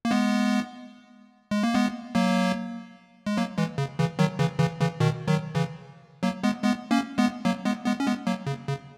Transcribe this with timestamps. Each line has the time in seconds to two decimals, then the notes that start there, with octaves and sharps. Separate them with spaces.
0.05 A#3
0.11 G#3 B3
1.51 G#3
1.63 A#3
1.74 G#3 B3
2.15 F#3 A#3
3.26 G#3
3.37 F#3 A#3
3.58 E3 G#3
3.78 C#3
3.99 C#3 E3
4.19 D#3 F#3
4.39 C#3 E3
4.59 C#3 E3
4.80 C#3 E3
5.00 B2 D#3
5.28 D#3 F#3
5.55 C#3 E3
6.23 F#3 A#3
6.43 G#3 B3
6.63 G#3 B3
6.91 A#3 C#4
7.18 G#3 B3
7.45 F#3 A#3
7.65 G#3 B3
7.86 G#3 B3
8.00 C#4
8.07 G#3 B3
8.27 F#3 A#3
8.47 C#3
8.68 C#3